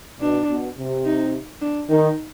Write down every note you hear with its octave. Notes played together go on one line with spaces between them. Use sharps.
B2 D4
B2
C3
D#4
D4
D#3 D#4